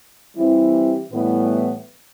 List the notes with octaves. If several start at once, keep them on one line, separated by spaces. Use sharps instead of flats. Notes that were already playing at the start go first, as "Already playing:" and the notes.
E3 G3 C4 E4 G4
A2 E3 G3 B3